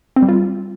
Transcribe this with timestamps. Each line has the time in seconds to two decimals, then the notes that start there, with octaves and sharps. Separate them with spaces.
0.16 C4
0.23 G3
0.29 F4